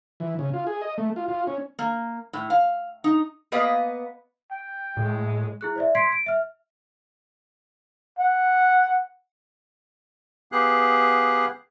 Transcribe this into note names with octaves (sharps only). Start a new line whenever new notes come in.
E3
C#3
F4
G#4
D#5
A3
F4
F4
C#4
A#3
A2
F5
D#4
A#3 B3 B4 D#5 F5
G5
A2 G#3
E4 G#4 F#6
C5 D5 E5
C6 G#6 B6 C7 D7
D7
E5 F6
F#5
B3 G4 G#4 F5 F#6